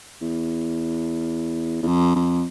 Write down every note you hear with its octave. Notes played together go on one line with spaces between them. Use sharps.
E2
E2
F2
F2